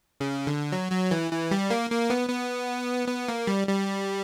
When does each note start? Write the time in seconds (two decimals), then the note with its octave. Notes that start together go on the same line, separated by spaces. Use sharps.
0.20 C#3
0.47 D3
0.72 F#3
0.92 F#3
1.11 E3
1.32 E3
1.51 G3
1.70 A#3
1.91 A#3
2.10 B3
2.29 B3
3.08 B3
3.28 A#3
3.47 G3
3.67 G3